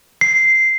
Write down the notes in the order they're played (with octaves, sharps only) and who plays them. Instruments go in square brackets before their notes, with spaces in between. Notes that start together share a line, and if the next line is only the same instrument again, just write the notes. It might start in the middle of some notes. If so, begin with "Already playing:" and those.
[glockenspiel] C7